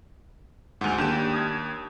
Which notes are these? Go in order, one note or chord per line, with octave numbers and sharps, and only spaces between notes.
D2 G#2 F#5 G#5 F7
D#2 D4 G4 G6 E7
D#6 F6 G#6